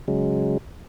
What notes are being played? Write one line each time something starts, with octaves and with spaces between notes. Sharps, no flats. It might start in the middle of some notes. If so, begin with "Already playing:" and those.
C#3 F#3 G#3